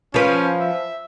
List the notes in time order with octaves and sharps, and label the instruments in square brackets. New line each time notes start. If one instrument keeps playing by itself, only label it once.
[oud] F3 B4 [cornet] C#4
[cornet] E5